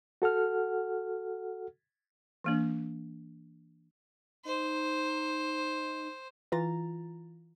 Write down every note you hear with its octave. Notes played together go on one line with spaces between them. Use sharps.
F#4 A4 F#5 F6
E3 A#3 D4
D#4 C5
E3 F4 A#5 A6